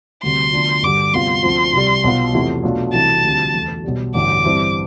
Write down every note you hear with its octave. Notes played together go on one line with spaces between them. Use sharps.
D2 C3 G3 C6
D2 D3 F3 B3 D4
G2 D3 G3 D6
D2 C3 G3 B3 F4 C6
D2 D3 F3 C4
C2 C3 G3
B1 B2 B3 F4
E2 C3 F3 A3 E4
B1 B2 A3 D4 F4
C2 C3 E3 A3 A5
D2 C3 G3 D4 F4
E2 D3 A3
B1 B2 G3
A1 G2 D3 D6
G2 E3 G3 C4 E4